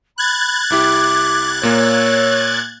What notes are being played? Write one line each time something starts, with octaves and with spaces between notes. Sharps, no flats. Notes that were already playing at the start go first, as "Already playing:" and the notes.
B5 F#6 G#6 A6
C2 E4 G4 D6
A#2 A#3 C#5 E6